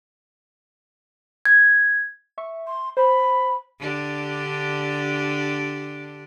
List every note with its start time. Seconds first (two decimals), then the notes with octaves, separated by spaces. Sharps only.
1.45 G#6
2.38 E5 C#6
2.67 C6
2.97 C5 B5
3.79 D3 D4 G4